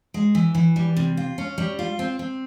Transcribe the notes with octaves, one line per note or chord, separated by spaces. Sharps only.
G#3
E3
E3
G3
C3
F4
C#4
G3
F4
C4
C4